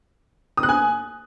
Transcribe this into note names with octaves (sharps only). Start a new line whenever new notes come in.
D#6
F#6
G#5